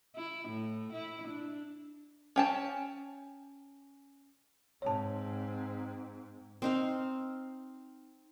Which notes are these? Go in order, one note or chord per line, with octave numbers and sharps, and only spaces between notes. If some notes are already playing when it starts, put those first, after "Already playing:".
E4
A2
E4
D4
C#4 G5 A5
G#2 C4 C#5 A5
C4 D#4 F5